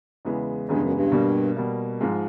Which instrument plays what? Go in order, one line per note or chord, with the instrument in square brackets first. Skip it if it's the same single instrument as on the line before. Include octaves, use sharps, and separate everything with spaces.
[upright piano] E2 C#3 E3 G#3 B3
[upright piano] E2 C#3 E3 G#3 B3 [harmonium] G2
[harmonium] F#2
G2
[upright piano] B2 G3 A#3
B2 G3 A#3
G#2 F3 G#3